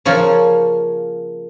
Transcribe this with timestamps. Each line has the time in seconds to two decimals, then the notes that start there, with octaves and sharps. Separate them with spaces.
0.05 C#3 F3 A#3 C#5